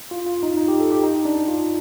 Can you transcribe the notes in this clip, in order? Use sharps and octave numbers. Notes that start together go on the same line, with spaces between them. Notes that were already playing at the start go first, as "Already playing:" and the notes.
F4
F4
D#4
D#4
G4
A4
G4
D#4
D4
F4